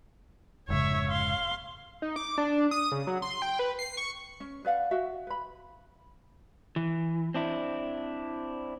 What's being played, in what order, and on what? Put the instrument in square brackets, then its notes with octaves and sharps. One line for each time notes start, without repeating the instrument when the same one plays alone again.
[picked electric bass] F1 G#2 C#3 [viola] C#5 E5
[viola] F5 C6
[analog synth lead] D#4
D6
D4
D#6
C#3
F#3
C6
G5
B4
C7
C#6
[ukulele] C#4
B4 D5 F5 F#5
F#4 E5 F5
B4 B5
[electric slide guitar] E3
C4 D4 E4